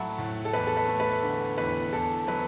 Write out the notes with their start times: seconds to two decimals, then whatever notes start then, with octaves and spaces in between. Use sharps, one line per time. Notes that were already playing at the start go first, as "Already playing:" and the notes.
Already playing: A2 F#3 A3 E5 F#5 A5 B5
0.18 A2
0.45 A4
0.53 E2 B4
0.67 A4
0.77 B4
0.88 A3
1.00 B4
1.23 D3
1.58 E2 B4
1.93 E2 A4
2.27 F#3 B4